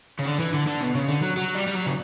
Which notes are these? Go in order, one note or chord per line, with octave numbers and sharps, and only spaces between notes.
C#3
D3
E3
D3
D3
B2
C#3
D3
F#3
F#3
G3
G3
F#3
C#3